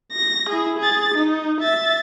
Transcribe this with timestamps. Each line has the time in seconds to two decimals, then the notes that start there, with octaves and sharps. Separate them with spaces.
0.13 A#6
0.50 E4 G#4
0.79 G#4 A6
1.15 D#4
1.61 E5 A6